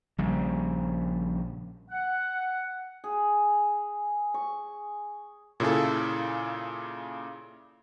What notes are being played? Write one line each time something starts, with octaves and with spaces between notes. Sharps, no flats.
A#1 C#3 G3
F#5
G#4
C#6
A#2 C#3 E4 G#4 A4